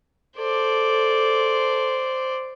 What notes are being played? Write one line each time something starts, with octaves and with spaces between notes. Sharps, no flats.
A4 C5 D5